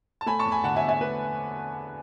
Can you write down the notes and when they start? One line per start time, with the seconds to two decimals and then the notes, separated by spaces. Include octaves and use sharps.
0.21 A5
0.26 A3 G#5 B5
0.39 A5 C#6
0.45 E2
0.51 G#5 B5
0.64 D3 F#5 A5
0.76 E5 G#5
0.83 E2
0.89 E5 G#5
1.01 A3 B4